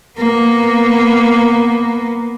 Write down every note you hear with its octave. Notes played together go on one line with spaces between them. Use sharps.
A#3 B3